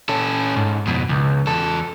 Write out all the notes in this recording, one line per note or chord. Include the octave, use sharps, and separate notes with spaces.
C#4 A4
G#2
F2 B2
C#2
E2 A4